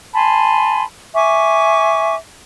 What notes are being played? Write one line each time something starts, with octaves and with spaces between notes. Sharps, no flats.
G#5 A5 B5 C6
E5 G#5 C#6 D6